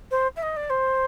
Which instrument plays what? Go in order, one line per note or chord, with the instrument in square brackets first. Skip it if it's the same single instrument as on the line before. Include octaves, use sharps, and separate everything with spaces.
[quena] C5
E5
D#5
D5
C5